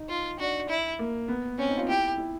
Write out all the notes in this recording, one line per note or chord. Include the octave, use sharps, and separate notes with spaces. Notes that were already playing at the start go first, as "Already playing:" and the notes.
Already playing: D#4
F4
D4 F#4
E4
A#3
B3
C4 C#4
D#4
F4
E4 G4
E4